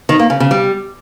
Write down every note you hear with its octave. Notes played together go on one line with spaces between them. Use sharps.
D#3
A#3
C#3
C#3
G3